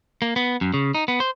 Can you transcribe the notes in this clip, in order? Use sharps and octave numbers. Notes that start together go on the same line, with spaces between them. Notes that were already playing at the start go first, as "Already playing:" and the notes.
A#3
B3
F#2
C#3
D#4
B3
C5